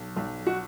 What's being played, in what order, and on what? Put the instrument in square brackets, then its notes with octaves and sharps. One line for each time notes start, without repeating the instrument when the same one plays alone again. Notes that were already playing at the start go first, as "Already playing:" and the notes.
Already playing: [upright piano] B1
B1
F#4